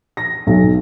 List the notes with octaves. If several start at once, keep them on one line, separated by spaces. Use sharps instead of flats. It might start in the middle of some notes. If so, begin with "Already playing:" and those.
A#6
B1